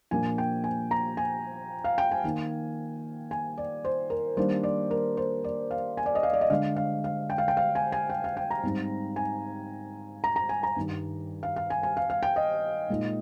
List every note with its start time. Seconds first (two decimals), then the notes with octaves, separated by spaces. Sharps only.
0.11 A#2 F3 A#3 D4 G#5
0.38 G5
0.64 G#5
0.91 A#5
1.17 G#5
1.84 F5
1.98 G5
2.11 G#5
2.24 D#3 A#3 D#4
3.31 G#5
3.58 D5
3.85 C5
4.10 A#4
4.37 D#3 G3 A#3 D4 C5
4.63 D5
4.91 A#4
5.17 C5
5.44 D5
5.71 F5
5.97 G#5
6.06 D5
6.15 D#5
6.23 F5
6.33 D5
6.41 D#5
6.50 D3 G#3 D4 F5
6.76 F5
7.04 F5
7.30 G5
7.38 F5
7.48 G5
7.57 F5
7.75 G#5
7.92 G#5
8.10 G5
8.24 F5
8.37 G5
8.51 A#5
8.63 G#2 G3 C4 D#4
9.16 G#5
10.24 A#5
10.36 A#5
10.49 G#5
10.63 A#5
10.76 G2 D#3 G3 D4
11.43 F5
11.56 F5
11.70 G#5
11.83 G#5
11.97 F5
12.10 F5
12.23 G5
12.36 D#5
12.89 A#2 G#3 D#4